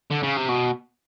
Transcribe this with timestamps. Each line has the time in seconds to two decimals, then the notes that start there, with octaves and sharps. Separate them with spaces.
0.11 D3
0.23 C#3
0.37 C3
0.49 B2